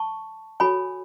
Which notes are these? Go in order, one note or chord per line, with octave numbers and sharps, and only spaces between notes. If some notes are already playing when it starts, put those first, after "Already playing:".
Already playing: A5 C#6
F#4 A4 C#5 G#5 B5